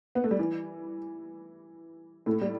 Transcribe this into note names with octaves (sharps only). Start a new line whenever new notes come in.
B3
A3
G3
E3
A2 A3
G3